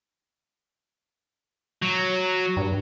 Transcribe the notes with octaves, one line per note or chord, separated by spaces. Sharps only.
F#3
G2